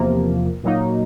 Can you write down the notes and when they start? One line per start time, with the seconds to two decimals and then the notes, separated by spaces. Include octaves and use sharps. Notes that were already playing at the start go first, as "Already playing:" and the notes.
Already playing: E2 C3 F3 A#3
0.63 A#2 F#3 A#3 D#4